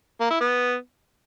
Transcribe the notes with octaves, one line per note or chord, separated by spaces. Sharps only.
A#3
E4
B3